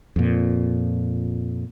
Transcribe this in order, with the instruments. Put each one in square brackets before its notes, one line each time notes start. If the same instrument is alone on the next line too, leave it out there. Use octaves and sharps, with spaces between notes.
[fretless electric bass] F2 A#2